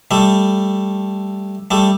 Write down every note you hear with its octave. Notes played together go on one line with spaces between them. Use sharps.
G3 A3
G3 A3